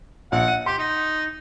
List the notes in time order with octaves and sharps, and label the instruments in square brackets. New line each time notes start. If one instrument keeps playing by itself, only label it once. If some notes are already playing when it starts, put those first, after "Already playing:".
[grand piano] A#1 C#7 [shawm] F#5
[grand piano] D#7
[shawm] G4 [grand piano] C6
[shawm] D#4